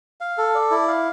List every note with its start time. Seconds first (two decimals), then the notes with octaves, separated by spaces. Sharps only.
0.21 F5
0.38 A4
0.55 D5
0.71 E4
0.88 F5